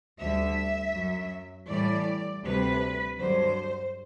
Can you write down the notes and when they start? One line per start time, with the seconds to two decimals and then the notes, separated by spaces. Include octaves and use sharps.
0.19 D2 D3 G3 E5
0.93 F#2 F#3
1.68 A2 E3 G3 D5
2.44 D2 C3 G3 B4
3.19 G2 D3 F#3 C5